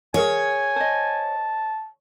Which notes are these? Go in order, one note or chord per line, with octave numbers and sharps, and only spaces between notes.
G#4 A#4 C#5 F5 G#5
C5 D#5 A5